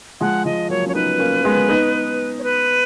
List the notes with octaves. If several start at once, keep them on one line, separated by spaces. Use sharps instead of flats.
F3 G#3 F#5
F3 G#3 D#5
F#3 A#3 C#5
C#4 C#5
B3 D#4 B4
A#3 C#4
G#3 B3
B3 D#4
C#5
B4